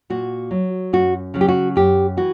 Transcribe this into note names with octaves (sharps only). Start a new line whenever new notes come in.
A#2 F#4
F#3
F#2 F#4
C#3 F#3
G4
F#4
F#2 G4
E3 F#4